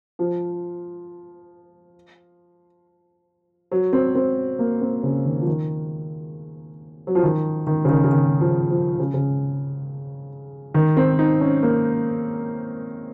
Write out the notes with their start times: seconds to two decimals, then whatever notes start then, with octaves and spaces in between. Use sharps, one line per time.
0.19 F3
3.72 F#3
3.93 C4
4.15 C4
4.59 A#3
4.81 C4
5.03 C#3
5.25 D#3
5.41 F3
5.47 D#3
7.07 F#3
7.15 F3
7.23 D#3
7.67 D#3
7.85 C#3
7.89 D#3
8.04 C#3
8.11 D#3
8.40 F3
8.70 F3
8.99 C#3
9.14 C#3
10.74 D#3
10.97 C4
11.19 D#4
11.41 C#4
11.63 A#3